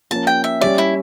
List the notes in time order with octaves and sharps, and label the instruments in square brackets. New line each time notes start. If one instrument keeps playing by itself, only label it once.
[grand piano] F3 A#3 C#4 [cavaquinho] A5
[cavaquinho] G5
E5
[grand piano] G3 C#4 G4 C#5 E5 [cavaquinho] D5
[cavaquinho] E4